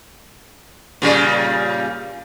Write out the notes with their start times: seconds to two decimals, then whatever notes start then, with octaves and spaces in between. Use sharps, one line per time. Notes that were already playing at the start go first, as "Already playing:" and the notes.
1.02 A#2 C#3 G3